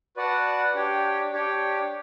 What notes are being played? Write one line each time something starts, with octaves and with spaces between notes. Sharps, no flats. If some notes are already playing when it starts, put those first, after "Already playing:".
F#4 B4 D5 F#5 A5
D4 G4 C#5 G5
D4 G4 C#5 G5